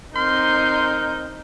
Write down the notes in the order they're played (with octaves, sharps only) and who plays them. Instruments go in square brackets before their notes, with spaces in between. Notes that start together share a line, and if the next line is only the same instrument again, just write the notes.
[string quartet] C4 D#4 G6 [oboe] A#4 [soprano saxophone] C6